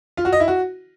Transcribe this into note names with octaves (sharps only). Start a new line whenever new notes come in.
F4
F#4
D#5
E4
F#4